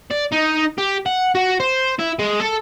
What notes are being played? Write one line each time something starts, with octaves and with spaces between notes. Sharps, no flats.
D5
D#4
G4
F#5
F#4
C5
E4
G#3
A4